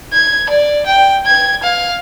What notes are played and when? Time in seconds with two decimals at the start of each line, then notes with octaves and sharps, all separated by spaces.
0.13 G#6
0.49 D5
0.86 G5
1.26 G#6
1.63 F5